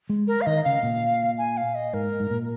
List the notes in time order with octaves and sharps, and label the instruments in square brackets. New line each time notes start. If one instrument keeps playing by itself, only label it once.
[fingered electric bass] G#3
[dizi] A#4
F5
[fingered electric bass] D#3 [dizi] D#5
[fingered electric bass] C#3 [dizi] F5
[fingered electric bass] A#2
[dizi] G#5
F5
D#5
[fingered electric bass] G#2 [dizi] A#4
[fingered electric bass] G#2
A#2